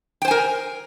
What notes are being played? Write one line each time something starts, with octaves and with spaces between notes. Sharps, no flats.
A#4 C5 G5 G#5